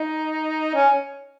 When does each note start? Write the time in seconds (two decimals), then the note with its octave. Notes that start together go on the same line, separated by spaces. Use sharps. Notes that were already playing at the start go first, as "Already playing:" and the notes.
Already playing: D#4
0.75 C#4